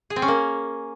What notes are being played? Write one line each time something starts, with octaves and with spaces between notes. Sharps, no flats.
G#4
C4
C#4
A#3